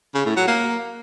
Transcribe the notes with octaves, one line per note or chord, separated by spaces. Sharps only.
C#3
A2
F#3
A#3